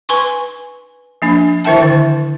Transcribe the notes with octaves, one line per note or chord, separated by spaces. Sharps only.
B4 G#5 C6 C#6
F3 A#3 D4
D#3 E4 A#4 E5 G5 A5
D3